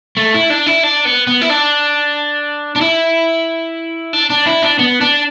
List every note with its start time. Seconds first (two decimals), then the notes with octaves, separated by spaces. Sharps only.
0.17 A3
0.34 E4
0.50 D4
0.67 E4
0.83 D4
1.05 B3
1.27 B3
1.41 E4
1.50 D4
2.76 D4
2.81 E4
4.13 D4
4.30 D4
4.46 E4
4.62 D4
4.79 B3
5.01 D4